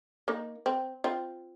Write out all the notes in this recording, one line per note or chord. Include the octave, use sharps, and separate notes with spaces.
A#3 D#4
C4
C4 F4